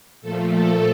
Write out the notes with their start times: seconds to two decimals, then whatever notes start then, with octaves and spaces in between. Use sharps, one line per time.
0.21 A#2 F3 A3 A4
0.52 A4